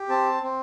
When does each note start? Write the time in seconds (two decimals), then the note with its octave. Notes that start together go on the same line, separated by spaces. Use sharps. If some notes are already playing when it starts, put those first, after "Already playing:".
Already playing: G4
0.09 C4 A5
0.42 C4